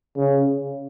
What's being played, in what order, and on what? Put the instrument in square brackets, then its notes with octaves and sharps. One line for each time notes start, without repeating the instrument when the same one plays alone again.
[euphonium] C#3